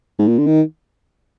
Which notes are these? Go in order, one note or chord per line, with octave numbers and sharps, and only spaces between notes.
G#2
A#2
D3
D#3